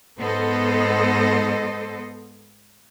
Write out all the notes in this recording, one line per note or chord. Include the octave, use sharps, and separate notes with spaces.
G#2 B3 A4 C5 D#5